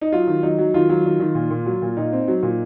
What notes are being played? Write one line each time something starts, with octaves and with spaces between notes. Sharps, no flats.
D#4
F#3 F4
D#3
F#3 D#4
F#3
D#3 F4
F#3
D#3
D#3
A#2
A#2
F#3
A#2
A#2 D#4
C4
F#3
A#2